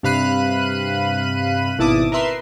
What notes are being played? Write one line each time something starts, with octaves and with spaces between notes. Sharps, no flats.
G2 C3 F5 B5 F#6 D#7
G#1 B2 E4 A5 D6 D#6
A#4 B4 E5 C6